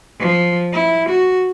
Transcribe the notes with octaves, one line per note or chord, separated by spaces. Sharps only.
F3
E4
F#4